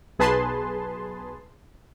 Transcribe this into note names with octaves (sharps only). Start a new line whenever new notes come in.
B1 G#4 B4 A5 C6